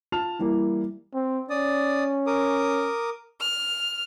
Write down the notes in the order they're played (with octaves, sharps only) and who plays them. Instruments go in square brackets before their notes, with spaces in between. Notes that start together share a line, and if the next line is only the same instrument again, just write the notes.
[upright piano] F4 A5 F6 F7
E3 G3 A#3 E4
[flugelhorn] C4
[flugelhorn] C#4 [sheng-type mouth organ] D5 D#6
[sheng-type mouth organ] A#4 D6 D#6
[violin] F6